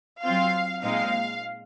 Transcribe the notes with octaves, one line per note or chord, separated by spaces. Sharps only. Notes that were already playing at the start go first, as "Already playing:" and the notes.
F#3 C4 F4 F5
A#2 G#3 C4 D#4 F5